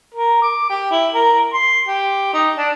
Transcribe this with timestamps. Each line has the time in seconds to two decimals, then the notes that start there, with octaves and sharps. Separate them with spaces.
0.14 A#4
0.42 D6
0.70 G4
0.91 E4
1.14 A#4
1.53 C6
1.87 G4
2.33 D#4
2.57 D4